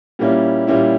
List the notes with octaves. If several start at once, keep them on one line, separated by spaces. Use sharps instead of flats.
A#2 G3 A#3 C#4 E4
A#2 G3 A#3 C#4 E4